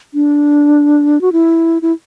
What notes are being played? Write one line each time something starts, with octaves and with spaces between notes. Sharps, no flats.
D4
F#4
E4
E4